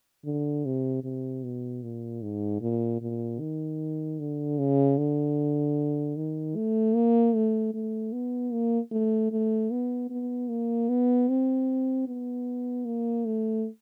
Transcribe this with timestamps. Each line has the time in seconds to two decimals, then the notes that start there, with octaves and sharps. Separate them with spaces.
0.25 D3
0.65 C3
1.04 C3
1.44 B2
1.83 A#2
2.22 G#2
2.61 A#2
3.01 A#2
3.40 D#3
4.19 D3
4.59 C#3
4.98 D3
6.16 D#3
6.56 A3
6.95 A#3
7.35 A3
7.74 A3
8.13 B3
8.52 A#3
8.92 A3
9.32 A3
9.71 B3
10.10 B3
10.49 A#3
10.89 B3
11.29 C4
12.08 B3
12.85 A#3
13.25 A3